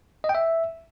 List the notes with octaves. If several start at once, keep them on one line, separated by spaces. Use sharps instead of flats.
D#5
G5
E5